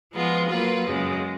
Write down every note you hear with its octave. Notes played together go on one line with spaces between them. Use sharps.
F3 G#3 B3 F4
F#3 A#3 F4 B4
F#2 C#3 G#3